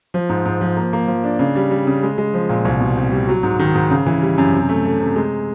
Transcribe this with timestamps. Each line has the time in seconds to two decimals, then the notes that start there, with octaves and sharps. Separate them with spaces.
0.14 F3
0.29 G#2
0.45 G#2
0.61 F3
0.77 A#3
0.93 A#3
1.08 F3
1.24 D4
1.39 C#3
1.56 G3
1.71 G3
1.87 C#3
2.03 G#3
2.18 G#3
2.34 F3
2.49 A#2
2.65 C2
2.80 B2
2.97 C4
3.12 G3
3.28 F#3
3.43 G#2
3.59 D#3
3.75 G#2
3.90 C#3
4.07 E3
4.22 G3
4.38 F#2
4.53 C3
4.69 A3
4.85 A3
5.00 C3
5.16 G#3